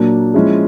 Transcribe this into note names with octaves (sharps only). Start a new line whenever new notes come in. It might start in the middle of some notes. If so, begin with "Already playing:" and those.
Already playing: A#2 F#3 A#3 D4
F3 G#3 C#4 E4 G#4